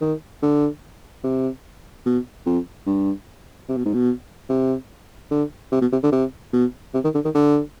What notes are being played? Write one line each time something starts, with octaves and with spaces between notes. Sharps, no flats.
D#3
D3
C3
B2
F2
G2
C3
B2
G#2
B2
C3
D3
C3
B2
C3
D3
C3
B2
C3
D#3
D3
D#3
D3